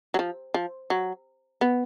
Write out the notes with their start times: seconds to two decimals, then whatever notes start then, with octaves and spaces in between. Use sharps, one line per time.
0.14 F#3
0.19 F3
0.54 F3
0.90 F#3
1.61 B3